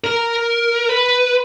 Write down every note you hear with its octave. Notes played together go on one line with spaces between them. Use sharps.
A#4
B4